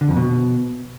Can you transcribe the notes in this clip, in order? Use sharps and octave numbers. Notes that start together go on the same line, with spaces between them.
D3
F2
B2